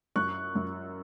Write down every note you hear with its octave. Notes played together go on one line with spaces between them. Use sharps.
F#2 C#6 F#6
F#2